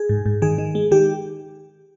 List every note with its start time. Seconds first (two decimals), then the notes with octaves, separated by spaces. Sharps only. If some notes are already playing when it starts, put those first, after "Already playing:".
Already playing: G#4
0.09 G#2
0.26 G#2
0.42 D#3 G#4
0.58 D#3
0.75 G#3
0.91 D#3 G4